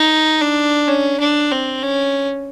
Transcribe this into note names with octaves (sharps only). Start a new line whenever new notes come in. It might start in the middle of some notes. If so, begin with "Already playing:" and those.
Already playing: D#4
D4
C#4
D4
C4
C#4